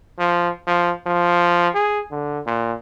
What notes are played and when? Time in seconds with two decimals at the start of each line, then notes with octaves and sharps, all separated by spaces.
0.19 F3
0.67 F3
1.06 F3
1.75 G#4
2.11 D3
2.46 A#2